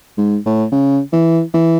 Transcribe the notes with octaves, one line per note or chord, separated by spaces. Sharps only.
G#2
A2
C#3
E3
E3